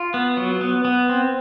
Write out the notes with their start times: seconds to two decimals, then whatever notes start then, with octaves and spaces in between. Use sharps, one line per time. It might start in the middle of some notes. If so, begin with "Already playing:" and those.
Already playing: F4
0.14 B3
0.37 F#3
0.61 B3
0.85 B3
1.09 C4